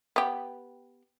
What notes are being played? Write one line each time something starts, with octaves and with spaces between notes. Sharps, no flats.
B3 G4